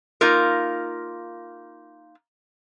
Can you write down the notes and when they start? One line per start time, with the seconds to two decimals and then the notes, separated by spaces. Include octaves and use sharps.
0.21 A#3 D#4 F4 A#4